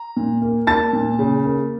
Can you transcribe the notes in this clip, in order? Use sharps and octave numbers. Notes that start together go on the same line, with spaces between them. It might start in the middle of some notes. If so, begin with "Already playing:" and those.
Already playing: A#5
A#2
A#3
A#3 A5 A6
A#2
C#3
A#3